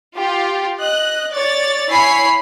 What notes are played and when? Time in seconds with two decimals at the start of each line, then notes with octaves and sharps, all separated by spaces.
0.17 F4 G4
0.80 D#5 F#6
1.33 C#5 D5 A6
1.89 E4 C#5 G#5 B5 C7